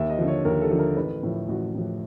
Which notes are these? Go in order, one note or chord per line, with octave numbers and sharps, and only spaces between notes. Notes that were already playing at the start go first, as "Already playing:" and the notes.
Already playing: D#2 E5
D#5
D3 F3
C#5
D#2 A#4
A4
D3 F3
A#4
A1 B4
A2 F3
A1 F#4
A2 F3